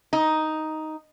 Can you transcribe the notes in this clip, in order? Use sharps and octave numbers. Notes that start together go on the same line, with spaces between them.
D#4